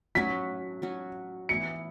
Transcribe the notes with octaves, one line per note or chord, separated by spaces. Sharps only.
F#3 C#4 F#4 B6
F#3 C#4 F#4
E3 B3 E4 C#7